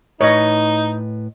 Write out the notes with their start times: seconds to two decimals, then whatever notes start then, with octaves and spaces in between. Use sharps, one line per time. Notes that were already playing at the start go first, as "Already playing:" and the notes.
0.21 A2 D#4 B4 C#5 D#5